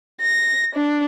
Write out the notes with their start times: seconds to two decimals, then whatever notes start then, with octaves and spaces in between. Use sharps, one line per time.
0.21 A#6
0.75 D4